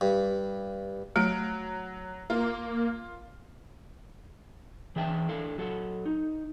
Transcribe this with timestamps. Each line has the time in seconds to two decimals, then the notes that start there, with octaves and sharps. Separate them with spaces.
0.01 G2
1.16 F#3 A3 D7
2.30 A#3 F4
4.96 E3 G#4 D5 E5 G5 A5
5.29 D4 E4 A4 F5
5.58 F#3 A4 F#5
6.06 D#4